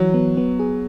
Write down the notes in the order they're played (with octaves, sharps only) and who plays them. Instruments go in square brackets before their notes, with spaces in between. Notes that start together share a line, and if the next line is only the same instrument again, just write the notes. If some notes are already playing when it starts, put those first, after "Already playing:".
Already playing: [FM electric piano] E3 [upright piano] F#3
[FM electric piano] B3
B3
G#4